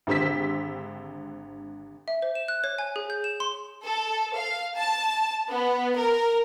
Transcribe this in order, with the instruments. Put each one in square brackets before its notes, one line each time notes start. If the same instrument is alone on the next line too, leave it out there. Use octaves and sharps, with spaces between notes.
[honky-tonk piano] G#1 D3 G4 C5 E6 B6
[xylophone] E5
C5
E7
F#6
C#5
G#5
G#4
G6
E7
C6
[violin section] A4
F5
A5
B3
A#4